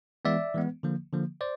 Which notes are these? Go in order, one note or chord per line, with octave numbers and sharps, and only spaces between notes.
E3 G#3 B3 D5 E5
E3 G#3 B3
D3 F3 A#3
D3 F3 A#3
C5 D5